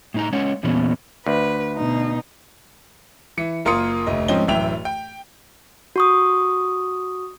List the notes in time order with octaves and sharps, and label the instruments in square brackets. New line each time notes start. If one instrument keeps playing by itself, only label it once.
[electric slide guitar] A2 D#4 A#5
G#3 C#4 C#5 F#5
E2 A#2 E3 B3 C#4
[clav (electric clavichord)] D2 [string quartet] B4
[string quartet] B2 D#4
[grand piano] E3 C#7
F#1 A#3 F4 C6 D#6 C#7
F1 D2 D#5
G#2 F3 C4 C#4 D#5 G7
D1 F#2 E3 E5 G5 F7
G5
[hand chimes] F#4 C#6 D#6